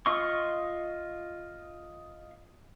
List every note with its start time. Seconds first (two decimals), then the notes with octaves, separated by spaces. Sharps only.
0.06 F4 D#5 C6 C#6